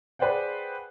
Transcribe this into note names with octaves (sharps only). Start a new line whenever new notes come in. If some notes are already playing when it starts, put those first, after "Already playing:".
G#4 B4 C5 D5 F#5 G5